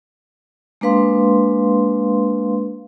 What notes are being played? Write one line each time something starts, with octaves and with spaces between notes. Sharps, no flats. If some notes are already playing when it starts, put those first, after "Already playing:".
G#3 A#3 D4 B4 F5 C6